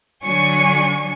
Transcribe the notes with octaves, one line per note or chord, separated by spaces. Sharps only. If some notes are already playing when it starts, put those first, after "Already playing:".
D3 F#3 D4 G#5 C#6 C#7